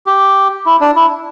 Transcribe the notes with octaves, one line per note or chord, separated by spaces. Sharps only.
G4
E4
D4
E4